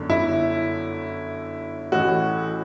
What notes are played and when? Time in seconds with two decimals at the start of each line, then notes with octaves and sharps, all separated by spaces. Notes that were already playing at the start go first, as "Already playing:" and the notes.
Already playing: G1 F#2 D3
0.10 E4
1.92 A1 A2 E3 F#4